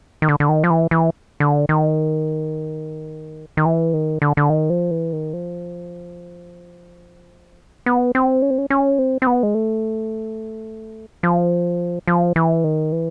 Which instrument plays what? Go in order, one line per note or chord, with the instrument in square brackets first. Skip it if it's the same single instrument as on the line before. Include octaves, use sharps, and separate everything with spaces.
[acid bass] D#3
D3
D3
D#3
F3
E3
E3
D3
D#3
D#3
E3
D#3
D3
D3
D#3
F3
E3
D#3
F3
B3
C4
C#4
C4
C#4
C#4
C4
C4
B3
G#3
A3
F3
F3
E3
D#3
E3